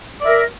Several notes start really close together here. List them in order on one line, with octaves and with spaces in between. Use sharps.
D5 E5 A#4